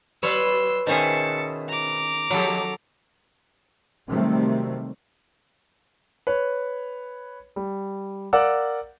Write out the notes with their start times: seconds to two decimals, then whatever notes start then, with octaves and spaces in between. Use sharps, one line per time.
0.23 F#3 B4 C#5 C6 E6
0.87 B2 D#3 C#4 G#4 C5 E5 A5 C#7
1.69 A#5 D6
2.31 F3 F#3 G#3 G4 A4
4.09 C3 D#3 F#3 G3 A3 C4
6.27 B4 C#5
7.56 G3
8.33 A#4 D5 F5 F#5 D6 E6